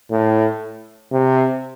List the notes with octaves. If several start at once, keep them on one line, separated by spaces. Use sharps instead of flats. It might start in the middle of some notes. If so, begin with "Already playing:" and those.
A2
C3